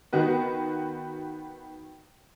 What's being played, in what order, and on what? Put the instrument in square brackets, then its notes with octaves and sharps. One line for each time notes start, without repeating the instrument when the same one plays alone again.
[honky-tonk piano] D#3 B3 F#4 B4